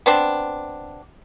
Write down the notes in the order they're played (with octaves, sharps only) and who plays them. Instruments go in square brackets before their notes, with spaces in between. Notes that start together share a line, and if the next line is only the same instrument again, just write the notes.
[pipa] B3 C4 D4